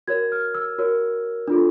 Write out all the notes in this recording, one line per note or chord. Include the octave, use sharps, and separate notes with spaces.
F#4 A#4 C#5 G#6
F6
E6
F#4 A#4 C#5
D4 F4 A4